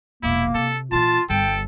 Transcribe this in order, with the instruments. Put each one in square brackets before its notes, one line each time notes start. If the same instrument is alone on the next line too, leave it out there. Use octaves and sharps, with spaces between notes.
[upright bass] E1 A#1 [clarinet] A#3 [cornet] E4
[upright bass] C3 [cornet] A4
[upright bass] A#2 E3 [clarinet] F4 [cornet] A5
[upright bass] G1 G2 [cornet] A4 [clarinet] G5